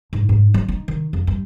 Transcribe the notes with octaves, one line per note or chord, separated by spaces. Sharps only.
G#2
G#2
F#3
D#4
D#3
F2
G2